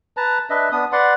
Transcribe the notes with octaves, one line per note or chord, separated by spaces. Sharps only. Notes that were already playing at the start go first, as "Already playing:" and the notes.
B4 A5 A#5
D4 B4 D#5 E5
B3 D4 D#6
B4 D5 F#5 C6